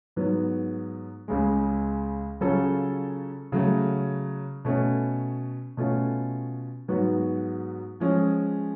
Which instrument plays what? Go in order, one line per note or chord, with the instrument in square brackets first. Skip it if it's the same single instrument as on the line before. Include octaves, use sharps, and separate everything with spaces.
[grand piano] G#2 F#3 B3
C#2 C#3 G#3
C#3 F#3 C#4 F4 A4
C#3 F#3 A3
B2 A3 C#4
B2 A3 C#4 F4
G#2 F#3 B3 F#4
F3 G#3 C#4 G#4